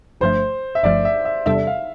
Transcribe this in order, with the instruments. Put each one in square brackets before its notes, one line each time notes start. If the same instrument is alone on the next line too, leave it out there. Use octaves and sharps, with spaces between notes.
[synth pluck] G1 G2 F3 A3 [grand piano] C5
[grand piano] E5
[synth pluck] G1 G2 F3 A3 [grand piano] D5
[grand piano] E5
E5
[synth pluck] E2 C3 G3 D4 A4 [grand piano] E5
[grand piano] F5